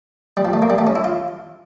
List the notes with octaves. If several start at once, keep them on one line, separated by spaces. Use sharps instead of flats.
G3
F3
A3
A#3
G3
A3
C#4
E4
F4